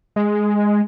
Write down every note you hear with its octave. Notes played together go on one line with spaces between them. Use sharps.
G#3